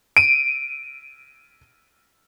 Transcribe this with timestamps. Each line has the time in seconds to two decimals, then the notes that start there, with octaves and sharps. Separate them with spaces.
0.17 D7 D#7